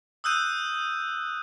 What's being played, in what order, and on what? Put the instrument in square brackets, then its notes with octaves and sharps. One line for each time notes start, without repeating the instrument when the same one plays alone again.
[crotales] D#6 E6 F#6 G6 D#7